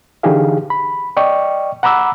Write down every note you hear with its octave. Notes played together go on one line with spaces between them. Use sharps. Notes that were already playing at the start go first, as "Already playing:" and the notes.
D3 E3 D#4 G4 G#4 F5
B5
D5 D#5 G5 C#6
F#5 A#5 B5 D6 E6